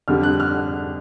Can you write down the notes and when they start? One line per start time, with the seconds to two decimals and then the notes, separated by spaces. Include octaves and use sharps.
0.08 F2 D3 G3 F6
0.23 F#6
0.40 F6
0.55 F#6